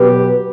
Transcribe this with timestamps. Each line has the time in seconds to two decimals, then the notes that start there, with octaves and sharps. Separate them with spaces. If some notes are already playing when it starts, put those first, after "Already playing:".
Already playing: B2 F#3 G4 B4